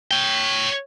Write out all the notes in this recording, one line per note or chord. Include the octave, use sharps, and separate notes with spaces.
C#5 G5